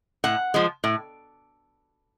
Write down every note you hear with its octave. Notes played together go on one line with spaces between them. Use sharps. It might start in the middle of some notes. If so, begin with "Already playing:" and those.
A2 F#5
F3 G#3
A2